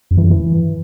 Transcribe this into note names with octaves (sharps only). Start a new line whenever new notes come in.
F#2
E3
F#2
E3